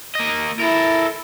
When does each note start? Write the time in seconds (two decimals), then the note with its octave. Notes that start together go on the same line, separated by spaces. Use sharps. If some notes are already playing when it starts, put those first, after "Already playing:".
0.15 A#3 D#5
0.59 E4 A4 A#4